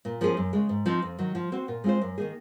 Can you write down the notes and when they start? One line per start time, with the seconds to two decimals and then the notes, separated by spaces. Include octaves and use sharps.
0.05 A#2
0.21 F3 A#3 C#4 G#4
0.37 F#2
0.53 C#3 G#3
0.69 G#2
0.86 F3 C4 D#4
1.02 F2
1.19 D#3 F#3
1.35 F3
1.52 C4 F#4 C5
1.68 A#2
1.84 G#3 C4 F4 C5
2.01 F#2
2.18 D#3 A#3 D#4 G#4